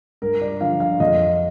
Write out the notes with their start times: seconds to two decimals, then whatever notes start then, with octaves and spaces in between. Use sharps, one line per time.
0.22 G2 A#4
0.41 D5
0.61 D3 F3 F5
0.80 F5
1.00 F2 D#5